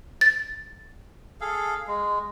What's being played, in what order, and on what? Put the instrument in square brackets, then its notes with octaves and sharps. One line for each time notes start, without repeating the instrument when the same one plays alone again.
[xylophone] A6
[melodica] G#4 A4 F5
G#3